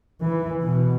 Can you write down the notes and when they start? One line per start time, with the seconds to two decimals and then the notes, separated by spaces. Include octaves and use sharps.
0.22 E3
0.63 B2